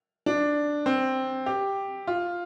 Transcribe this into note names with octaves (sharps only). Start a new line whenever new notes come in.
D4
C4
G4
F4